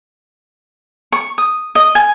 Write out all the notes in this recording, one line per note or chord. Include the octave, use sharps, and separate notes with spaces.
C#6
D#6
D#5
G#5